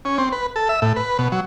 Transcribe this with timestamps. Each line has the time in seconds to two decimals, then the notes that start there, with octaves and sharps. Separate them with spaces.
0.05 C#4
0.18 C4
0.32 B4
0.56 A4
0.69 E5
0.82 A2
0.96 B4
1.19 B2
1.32 F#3